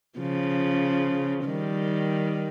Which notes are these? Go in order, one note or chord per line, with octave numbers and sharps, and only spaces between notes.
C#3 F3
D#3 G3